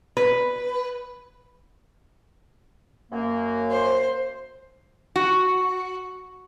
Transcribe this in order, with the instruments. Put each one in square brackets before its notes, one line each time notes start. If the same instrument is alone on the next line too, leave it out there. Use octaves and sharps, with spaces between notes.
[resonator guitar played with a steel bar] B4
[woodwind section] F#2 A#3
[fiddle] C5
[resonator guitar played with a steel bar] F#4